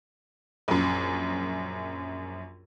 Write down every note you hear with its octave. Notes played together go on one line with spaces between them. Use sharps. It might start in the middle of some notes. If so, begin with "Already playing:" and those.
A#1 F#2